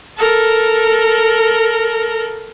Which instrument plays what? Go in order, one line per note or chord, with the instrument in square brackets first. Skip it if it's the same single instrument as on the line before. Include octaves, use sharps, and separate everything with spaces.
[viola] A4 A#4